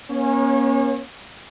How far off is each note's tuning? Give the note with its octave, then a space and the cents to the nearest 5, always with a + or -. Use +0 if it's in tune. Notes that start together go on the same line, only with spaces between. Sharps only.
A#3 +40 C#4 -10 C#5 -35